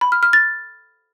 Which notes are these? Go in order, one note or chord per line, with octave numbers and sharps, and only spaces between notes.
B5
F6
F6
A6